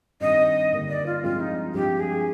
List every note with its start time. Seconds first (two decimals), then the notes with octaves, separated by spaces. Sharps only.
0.20 G2 D#3 G3 C4 G4 D#5
0.72 G2 D3 G3 A#3 D#4
0.88 D5
1.06 F4
1.23 G2 F3 G#3 C4 F4
1.40 D#4
1.74 G2 F3 G#3 C4 F4 G4
1.99 G#4